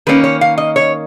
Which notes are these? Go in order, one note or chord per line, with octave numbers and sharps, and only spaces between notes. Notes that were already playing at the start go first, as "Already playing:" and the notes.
D#3 A#3 C#4 B4
C#5
F5
D#5
C#5